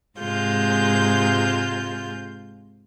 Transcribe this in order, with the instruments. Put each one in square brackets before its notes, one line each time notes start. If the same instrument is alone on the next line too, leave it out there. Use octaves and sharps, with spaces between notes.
[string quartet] G#2 C3 G#3 F4 G6